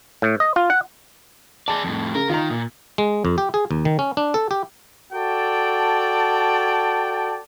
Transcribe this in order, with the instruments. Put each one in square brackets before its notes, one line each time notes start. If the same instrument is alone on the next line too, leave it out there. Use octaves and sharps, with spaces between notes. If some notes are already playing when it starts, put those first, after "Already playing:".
[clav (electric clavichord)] A2
D#5
F4
F#5
[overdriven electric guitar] G#4 D5 [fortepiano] A5
[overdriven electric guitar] F2 A2
[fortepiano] C#3 [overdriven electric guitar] A#4
[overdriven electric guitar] D#3 [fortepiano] F4 A#5
[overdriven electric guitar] A#2
[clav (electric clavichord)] G#3
F2
G4
G#4
D#2
D#3
C#4
D4
A4
G4
[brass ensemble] F#4 A4 D5 G5 A5